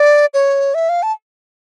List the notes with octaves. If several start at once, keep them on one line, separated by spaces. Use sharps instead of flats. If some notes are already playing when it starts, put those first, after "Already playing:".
Already playing: D5
C#5
E5
F5
A5